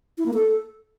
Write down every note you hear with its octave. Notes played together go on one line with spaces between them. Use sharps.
E4
A#3
A4